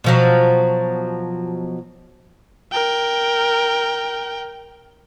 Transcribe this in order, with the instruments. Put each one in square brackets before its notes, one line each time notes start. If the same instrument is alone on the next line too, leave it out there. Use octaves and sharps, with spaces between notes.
[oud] B2 F3 F#3
[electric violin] A#4 G5